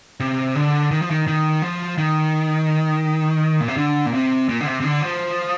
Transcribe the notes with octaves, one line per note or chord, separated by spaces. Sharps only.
C3
D3
D#3
F3
D#3
D#3
F3
D#3
A#2
C3
D3
A#2
C3
A#2
D3
C3
C3
D3
F3